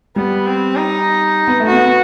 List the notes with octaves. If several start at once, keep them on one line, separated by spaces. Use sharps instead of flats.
G3 B3
C4
D#4
B3
A3
B3 F#4
B3